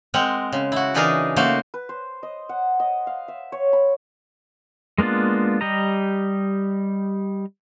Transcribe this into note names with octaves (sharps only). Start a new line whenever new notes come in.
G#3 C4 A#4 F#5
C#3
E4 F#4
C#3 E3 D4 D#4 G#4 A#4
C#3 A3 A#3 F#4 C5
B4
C5
D#5
F#5
D#5
F5
E5
C#5
B5
G#3 A#3 B3 D4 F4
G3 G4 D#5 A#5